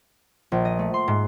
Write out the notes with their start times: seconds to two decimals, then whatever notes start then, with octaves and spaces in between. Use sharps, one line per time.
0.52 A#1
0.65 D#5
0.79 A3
0.94 C6
1.08 G#2